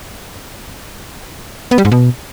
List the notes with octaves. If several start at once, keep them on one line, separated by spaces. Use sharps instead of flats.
B3
G3
G#2
B2